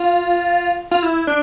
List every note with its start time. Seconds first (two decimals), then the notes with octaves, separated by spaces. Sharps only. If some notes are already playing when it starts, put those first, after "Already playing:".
Already playing: F4
0.91 F4
1.03 E4
1.27 D4